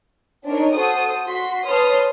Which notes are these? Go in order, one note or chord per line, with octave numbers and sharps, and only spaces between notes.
C4 D4 D#4 A#4 C#5
F#4 A4 C5 D#6
F#4 C6 B6
B4 C#5 A5 C6 D#6 F6